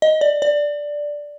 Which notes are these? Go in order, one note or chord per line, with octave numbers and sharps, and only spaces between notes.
D#5
D5
D5